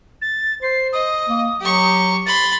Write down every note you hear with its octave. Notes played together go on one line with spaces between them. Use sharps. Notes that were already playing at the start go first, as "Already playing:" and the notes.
A6
C5 C7
D#5 D#6
A#3
F#3 G4 C#6
B5 C6 A6